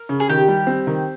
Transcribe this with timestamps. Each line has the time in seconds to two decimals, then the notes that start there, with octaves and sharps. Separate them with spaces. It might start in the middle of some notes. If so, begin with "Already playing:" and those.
Already playing: A#4
0.09 C#3
0.20 G#4
0.29 D#3 G4
0.48 G3
0.67 C4
0.87 D#3